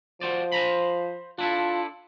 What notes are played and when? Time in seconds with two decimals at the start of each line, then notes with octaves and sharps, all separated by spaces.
0.21 F3 F#4 C5 D5
0.52 C5 A#5 B5
1.39 D4 E4 F4 A4